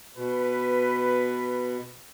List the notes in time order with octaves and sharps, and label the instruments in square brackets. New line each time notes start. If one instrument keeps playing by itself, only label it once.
[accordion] B2 [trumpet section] B4